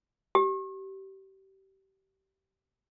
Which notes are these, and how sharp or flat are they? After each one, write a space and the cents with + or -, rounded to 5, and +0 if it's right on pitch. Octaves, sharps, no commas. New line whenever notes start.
G4 -30